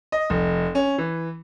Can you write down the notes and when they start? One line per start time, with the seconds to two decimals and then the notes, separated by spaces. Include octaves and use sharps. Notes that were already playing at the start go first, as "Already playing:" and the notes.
0.12 D#5
0.30 F1
0.75 C#4
0.98 E3